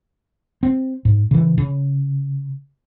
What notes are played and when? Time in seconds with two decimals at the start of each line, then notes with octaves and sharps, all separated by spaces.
0.63 C4
1.05 G#2
1.31 C#3 E3
1.58 C#3